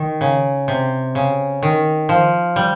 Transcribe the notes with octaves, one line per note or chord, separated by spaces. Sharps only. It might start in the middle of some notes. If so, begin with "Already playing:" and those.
Already playing: D#3
C#3
C3
C#3
D#3
F3
G3